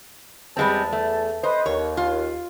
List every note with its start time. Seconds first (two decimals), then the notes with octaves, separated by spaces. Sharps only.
0.57 E2 G3 G#3 C4 A5
0.92 A3
1.43 B4 C5 D#5
1.66 D#2 C#5
1.97 F4